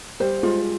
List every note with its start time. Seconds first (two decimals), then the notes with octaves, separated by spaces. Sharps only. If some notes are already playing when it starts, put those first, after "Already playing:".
0.20 G3 C5
0.43 G#3 F4